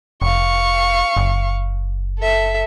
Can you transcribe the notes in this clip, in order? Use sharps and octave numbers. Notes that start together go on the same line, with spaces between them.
F1 F5 C#6
F#1
A4 E5